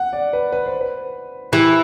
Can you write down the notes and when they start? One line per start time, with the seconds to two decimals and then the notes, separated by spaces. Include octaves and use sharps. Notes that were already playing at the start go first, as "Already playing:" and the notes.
Already playing: F#5
0.13 D5
0.33 B4
0.53 B4
0.66 C5
0.81 B4
1.52 E3 G4